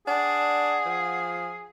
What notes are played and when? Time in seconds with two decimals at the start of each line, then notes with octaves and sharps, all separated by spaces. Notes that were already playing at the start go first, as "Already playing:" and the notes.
0.07 D4 G#4 F#5
0.85 F3